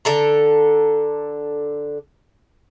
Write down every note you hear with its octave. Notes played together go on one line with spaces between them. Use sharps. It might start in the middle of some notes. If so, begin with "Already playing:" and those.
D3 A4 A#5